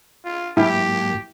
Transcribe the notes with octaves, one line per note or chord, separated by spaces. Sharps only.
F4
G#2 F#3 A#3 E4 G4